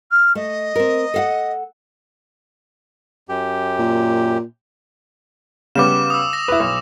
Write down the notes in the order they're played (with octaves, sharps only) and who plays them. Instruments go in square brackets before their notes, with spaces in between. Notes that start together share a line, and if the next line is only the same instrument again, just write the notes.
[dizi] F6
[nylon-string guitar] A3 [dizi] D#5
[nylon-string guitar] C4 A#4
A4 F5 F#5
[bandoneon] F#2 G4
[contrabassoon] A#2
[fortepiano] C#3 G3 B3 [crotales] D6 E7
[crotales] D#6 E6
A#6 F7
[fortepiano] E4 B4
B1